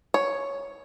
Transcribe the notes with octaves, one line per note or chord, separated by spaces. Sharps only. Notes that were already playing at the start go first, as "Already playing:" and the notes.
C#5